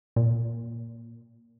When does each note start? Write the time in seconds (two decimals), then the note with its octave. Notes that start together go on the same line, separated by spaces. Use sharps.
0.16 A#2